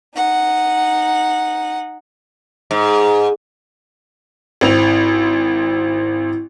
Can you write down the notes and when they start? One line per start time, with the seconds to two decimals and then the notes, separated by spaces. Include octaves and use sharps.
0.15 D#4 F#5
2.71 G#2
4.61 G#1 C4 E4 F7